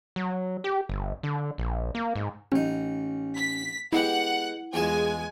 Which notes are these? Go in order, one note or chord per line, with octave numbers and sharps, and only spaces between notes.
F#3
G4
G1
D3
A#1
A#3
G#2
A1 C#4 D#4
B6
G#3 B3 E4 G4 F#5
E2 G#3 F4 G#5 A5